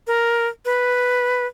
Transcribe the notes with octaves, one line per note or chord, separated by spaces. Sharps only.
A#4
B4